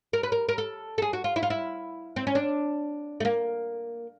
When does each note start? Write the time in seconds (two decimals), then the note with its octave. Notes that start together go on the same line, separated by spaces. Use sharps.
0.13 A#4
0.23 B4
0.32 A#4
0.49 A#4
0.58 A4
0.98 A4
1.02 G#4
1.13 F#4
1.24 F4
1.36 E4
1.43 F4
1.50 E4
2.16 C4
2.27 C#4
2.35 D4
3.20 A3
3.25 A#3